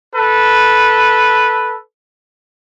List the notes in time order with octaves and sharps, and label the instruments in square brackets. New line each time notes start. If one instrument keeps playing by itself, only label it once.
[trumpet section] A4 B4